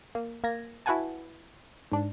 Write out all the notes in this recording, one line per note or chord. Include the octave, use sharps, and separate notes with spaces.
A#3
A#3 G#6 A#6
E4 F#4 B4 F#5 G#5 A5
G#2 D4